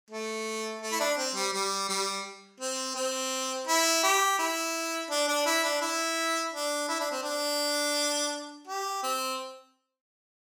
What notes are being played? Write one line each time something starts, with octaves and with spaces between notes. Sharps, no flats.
A3
A3
E4
D4
C4
G3
G3
G3
C4
C4
E4
G4
E4
D4
D4
E4
D4
E4
D4
E4
D4
C4
D4
G4
C4